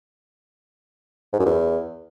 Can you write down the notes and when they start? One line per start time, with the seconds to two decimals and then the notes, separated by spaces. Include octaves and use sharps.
1.33 G#2
1.39 F#2
1.46 E2